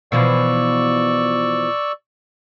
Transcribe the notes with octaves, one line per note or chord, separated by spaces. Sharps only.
B2 E3 F3 D5 C#6 E6